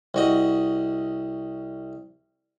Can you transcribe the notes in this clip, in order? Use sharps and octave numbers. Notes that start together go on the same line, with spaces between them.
C2 F#4 D#5